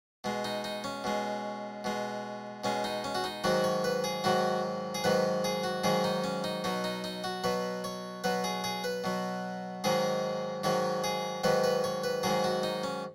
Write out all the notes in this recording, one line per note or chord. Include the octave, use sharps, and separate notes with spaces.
B2 G#3
D#4
D#4
C#4
B2 G#3
B2 G#3
B2 G#3 C#4
D#4
C#4
F#4
D#4
G#2 D#3 F#3 F#4
C#5
B4
G#4
G#2 D#3 F#3 F#4
G#4
G#2 D#3 F#3 B4
G#4
F#4
G#2 D#3 F#3 G#4
D#4
C#4
D#4
B2 F#3 D#4
D#4
D#4
F#4
B2 F#3 B4
C#5
B2 F#3 B4
G#4
G#4
B4
B2 F#3
G#2 D#3 F#3 G#4
G#2 D#3 F#3 C#5
G#4
G#2 D#3 F#3 B4
B4
C#5
B4
G#2 D#3 F#3 G#4
F#4
D#4
C#4